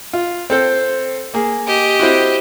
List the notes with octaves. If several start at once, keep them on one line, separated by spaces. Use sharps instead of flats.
F4
C4 A4 C5
A#3 G#4
G4 D#5
C4 E4 F#4